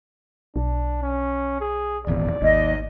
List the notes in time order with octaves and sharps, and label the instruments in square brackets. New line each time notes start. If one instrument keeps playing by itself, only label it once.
[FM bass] B1 [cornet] D4
[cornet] C#4
G#4
[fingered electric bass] D#1 G#1 E2 [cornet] D5
[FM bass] G#1 [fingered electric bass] D#2 [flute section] D#5